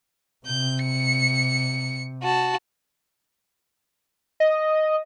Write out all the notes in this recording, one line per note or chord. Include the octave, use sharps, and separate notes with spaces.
C3 G6
C#7
F#4 A5
D#5